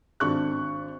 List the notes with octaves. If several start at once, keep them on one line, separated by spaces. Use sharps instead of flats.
G#1 D4 C#6 F#6